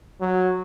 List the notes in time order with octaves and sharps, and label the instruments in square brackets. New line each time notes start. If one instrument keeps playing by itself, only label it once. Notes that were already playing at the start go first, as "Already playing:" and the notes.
[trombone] F#3